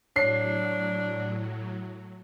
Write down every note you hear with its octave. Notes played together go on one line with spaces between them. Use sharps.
A2 F#3 D4 C#5 C7